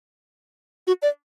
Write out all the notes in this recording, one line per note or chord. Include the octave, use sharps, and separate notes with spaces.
F#4
D5